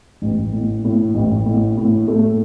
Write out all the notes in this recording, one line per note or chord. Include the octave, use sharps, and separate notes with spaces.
A1
A2
A2
A1
A2
A2
A3